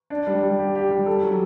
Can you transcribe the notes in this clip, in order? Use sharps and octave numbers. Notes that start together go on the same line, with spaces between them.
D4
G3
G3
G4
G4
G3
A4
F#3